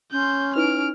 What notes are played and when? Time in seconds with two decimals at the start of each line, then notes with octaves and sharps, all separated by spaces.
0.12 C#4 C6 G6
0.56 D#4 E4 B4 F6 D7